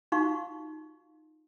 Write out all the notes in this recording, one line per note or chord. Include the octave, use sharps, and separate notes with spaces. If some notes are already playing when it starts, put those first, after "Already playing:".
D#4 F4 F#4 F5 C#6